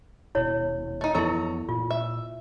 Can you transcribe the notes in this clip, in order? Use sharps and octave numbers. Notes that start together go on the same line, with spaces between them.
D#1 B2 E4 C#5
A3 D#4
F2 E3 B3 E4 A4 A#4 C#5 A#5
A#2 F4
E5